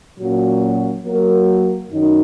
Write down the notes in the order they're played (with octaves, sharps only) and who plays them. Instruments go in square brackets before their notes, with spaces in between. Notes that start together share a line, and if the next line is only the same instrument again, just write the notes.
[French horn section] A#2 F#3 A#3 C#4 F#4
F#3 A#3 F#4 A#4
F#2 D#3 F#3 D#4